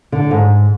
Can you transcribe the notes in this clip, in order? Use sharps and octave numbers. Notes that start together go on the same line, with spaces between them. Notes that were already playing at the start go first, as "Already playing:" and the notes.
D3
G#2